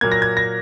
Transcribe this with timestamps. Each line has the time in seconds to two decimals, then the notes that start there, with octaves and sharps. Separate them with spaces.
0.01 A#2 F#3 A#3 G#6
0.12 A#6
0.22 G#6
0.37 A#6